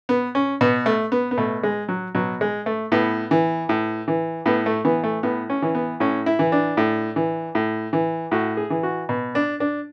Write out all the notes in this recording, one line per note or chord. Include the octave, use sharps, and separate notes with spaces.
B3
C#4
B2 B3
A3
B3
B3
B2 A3
G#3
F#3
B2 F#3
G#3
A3
A2 B3
E3
A2
E3
A2 B3
A3
E3 B3
A3
A2 B3
C#4
E3
B3
A2 C#4
E4
E3
D4
A2
E3
A2
E3
A2 F#4
G#4
E3
F#4
B2
D4
D4